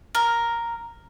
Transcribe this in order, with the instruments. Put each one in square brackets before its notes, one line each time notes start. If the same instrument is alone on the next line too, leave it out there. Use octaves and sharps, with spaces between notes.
[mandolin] A#4